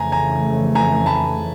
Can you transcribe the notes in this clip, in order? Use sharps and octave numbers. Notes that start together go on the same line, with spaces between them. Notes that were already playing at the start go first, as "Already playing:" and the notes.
Already playing: F2 C#3 E3 A3 G#5 A#5
G#5 A#5
G#5 A#5
A5 B5